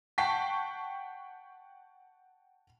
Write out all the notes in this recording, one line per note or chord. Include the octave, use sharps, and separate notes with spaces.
F#5 G5 A5 C#6 B6 C7